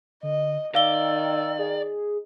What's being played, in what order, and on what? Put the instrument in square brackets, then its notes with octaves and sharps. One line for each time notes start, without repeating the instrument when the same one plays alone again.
[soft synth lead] D3 [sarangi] D#5
[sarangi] D#3 [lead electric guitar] D5 [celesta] F5 G7 [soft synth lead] E6
[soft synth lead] G#4